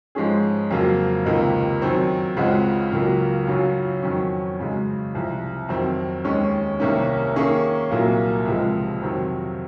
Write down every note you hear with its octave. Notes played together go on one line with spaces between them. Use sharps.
G#2 F3 G#3 C#4 G#4
F2 C#3 F#3 A#3 F4
C#2 C3 D#3 A#3 D#4
F#2 D#3 F#3 C4
C#2 C#3 G#3 C4 F#4
C#2 C#3 F#3 A#3
F#2 C#3 F#3 C#4 F4
F2 D#3 F#3 C#4
F#2 C#3 G#3
C2 C3 F3
F2 D#3 F#3 C4
D#2 D#3 G#3 C#4
C2 C3 D#3 A#3 C#4
D#3 A#3 C#4 G#4
C2 A#2 F#3 A#3
C#2 C3 F3 G#3
F2 C3 D#3 F#3 C4